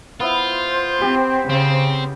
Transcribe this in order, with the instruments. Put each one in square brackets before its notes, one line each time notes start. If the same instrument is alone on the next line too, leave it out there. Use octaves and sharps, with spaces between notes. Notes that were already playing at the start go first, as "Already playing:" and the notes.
[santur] B3 E4 [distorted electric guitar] F4 [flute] C5
[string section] C4 [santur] G4
[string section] C#3 [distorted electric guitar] C4